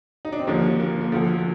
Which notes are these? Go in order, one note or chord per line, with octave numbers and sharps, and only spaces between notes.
D#4
D4
C4
D#2 D3 F3 A#3
A#3
A#3
D2 D3 F3 A3